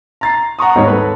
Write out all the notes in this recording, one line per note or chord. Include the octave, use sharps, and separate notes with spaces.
A#5 A6 C7
F#5 A#5 C#6 D#6
G#1 D#2 G3 G#3 D#4 C#5
A4 B4